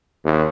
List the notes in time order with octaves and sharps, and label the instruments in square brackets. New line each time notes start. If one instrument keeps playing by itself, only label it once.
[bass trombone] D#2